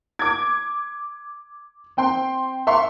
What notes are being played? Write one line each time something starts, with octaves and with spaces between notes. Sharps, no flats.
D6 G#6
C4 G5 C6
E5 F5 C6 C#6